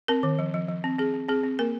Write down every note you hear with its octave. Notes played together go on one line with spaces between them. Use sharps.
C4 A#4
D#3
F3
F3
F3
C4
C4 G#4
C4
C4 G#4
C4
A#3 A#4